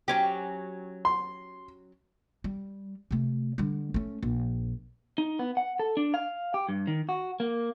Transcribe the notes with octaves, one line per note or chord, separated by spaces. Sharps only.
F#3 C#4 G4
C6
G3
C3 A3
D3 G3
A3 C#4
A#1
D#4
B3
F#5
A4
D4
F5
G4
G2
D#3
F#4
A#3